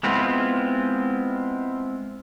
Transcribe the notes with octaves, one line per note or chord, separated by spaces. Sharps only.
G#3 B3 C4 E4 F4